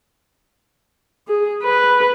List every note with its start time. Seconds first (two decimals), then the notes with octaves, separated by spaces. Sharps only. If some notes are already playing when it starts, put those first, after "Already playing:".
1.28 G#4
1.63 B4